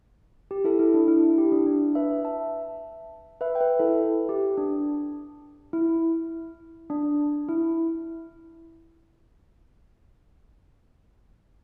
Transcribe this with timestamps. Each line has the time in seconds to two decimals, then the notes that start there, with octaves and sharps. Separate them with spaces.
0.51 G4
0.64 E4 A4
0.79 E4
0.94 D4
1.08 E4
1.23 E4
1.38 G4
1.52 D4
1.67 D4
1.95 B4 E5
2.25 E5 A5
3.41 B4 E5
3.55 G5
3.60 B4 E5
3.79 E4 A4
4.29 G4
4.57 D4
5.73 E4
6.90 D4
7.49 E4